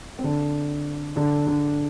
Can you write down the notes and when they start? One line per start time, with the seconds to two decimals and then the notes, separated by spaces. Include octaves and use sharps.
0.19 C4
0.24 D3 D4
1.16 D3 D4
1.47 D3 D4